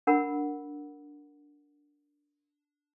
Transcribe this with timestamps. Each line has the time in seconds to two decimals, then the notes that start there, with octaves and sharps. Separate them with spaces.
0.07 D4 A#4 F#5 B5 E6